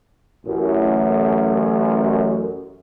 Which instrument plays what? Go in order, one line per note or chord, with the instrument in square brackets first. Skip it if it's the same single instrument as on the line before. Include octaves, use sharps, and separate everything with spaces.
[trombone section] A1 F#2